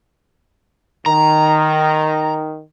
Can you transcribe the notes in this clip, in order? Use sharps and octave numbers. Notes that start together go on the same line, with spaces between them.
D#3 A#5